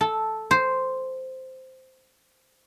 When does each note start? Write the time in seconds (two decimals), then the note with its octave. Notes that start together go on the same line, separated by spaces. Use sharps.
0.01 A4
0.51 C5